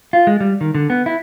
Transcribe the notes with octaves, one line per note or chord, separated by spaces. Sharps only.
F4
G#3
G3
D#3
D3
B3
E4